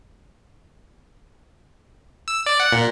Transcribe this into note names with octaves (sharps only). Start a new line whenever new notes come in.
E6
D5
F#5
A#2